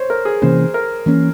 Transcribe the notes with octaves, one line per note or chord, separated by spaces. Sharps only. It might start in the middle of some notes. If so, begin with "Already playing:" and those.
Already playing: C5 C#5
A#4
G#4
C3 E3 A#3 C#4 C5
A#4
E3 A#3 C#4